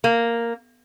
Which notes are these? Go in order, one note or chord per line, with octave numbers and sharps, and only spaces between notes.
A#3